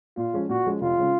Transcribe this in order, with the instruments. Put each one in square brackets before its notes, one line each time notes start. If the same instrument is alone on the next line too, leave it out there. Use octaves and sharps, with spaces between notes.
[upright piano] A#2 [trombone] F4
[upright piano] F3 G#3 C#4
[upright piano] A#2 [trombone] F#4
[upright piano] F3 G#3 C#4
[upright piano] F1 [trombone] F4
[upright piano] C#3 G#3 C#4